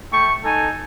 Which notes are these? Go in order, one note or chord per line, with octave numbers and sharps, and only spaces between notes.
A3 G5 C#6
D#4 A4 G#5